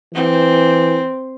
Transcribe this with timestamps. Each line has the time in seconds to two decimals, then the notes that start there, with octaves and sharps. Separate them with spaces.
0.15 E3 C4